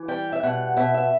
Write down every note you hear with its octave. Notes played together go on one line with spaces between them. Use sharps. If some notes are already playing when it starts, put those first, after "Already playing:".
Already playing: E3
G3 G5
E5
B2 F#5
B2 E5
E5